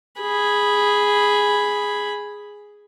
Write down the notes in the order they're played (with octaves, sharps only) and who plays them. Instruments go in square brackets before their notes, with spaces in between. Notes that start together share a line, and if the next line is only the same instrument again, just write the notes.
[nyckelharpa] G#4 B5